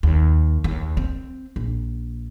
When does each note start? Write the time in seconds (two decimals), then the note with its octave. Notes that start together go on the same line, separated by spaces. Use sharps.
0.03 D#2
0.64 D#2
0.97 C4
1.56 A#1